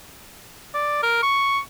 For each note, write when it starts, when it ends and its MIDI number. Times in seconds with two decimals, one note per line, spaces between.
0.74 0.98 74
1.03 1.22 70
1.23 1.59 85